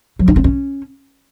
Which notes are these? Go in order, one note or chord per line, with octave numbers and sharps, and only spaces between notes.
F#3
D4
C4
C#4